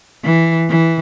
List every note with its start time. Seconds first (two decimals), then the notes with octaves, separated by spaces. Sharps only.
0.24 E3
0.69 E3